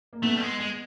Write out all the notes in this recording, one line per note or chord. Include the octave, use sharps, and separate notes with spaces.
A#3
A3 B3
G3
G#3
G#3